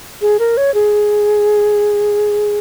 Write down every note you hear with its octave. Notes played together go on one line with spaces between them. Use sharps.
G#4
A#4
C#5
G#4